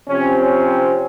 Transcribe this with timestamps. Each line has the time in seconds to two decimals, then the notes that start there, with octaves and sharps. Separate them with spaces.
0.08 C3 F3 C4 C#4
0.39 C#4